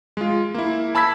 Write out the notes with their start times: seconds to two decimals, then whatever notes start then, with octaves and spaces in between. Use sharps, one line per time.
0.17 G#3 F4
0.54 A#3 E4
0.95 A5 B5 E6 G#6 B6